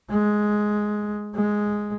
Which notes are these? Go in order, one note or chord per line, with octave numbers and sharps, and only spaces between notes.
G#3
G#3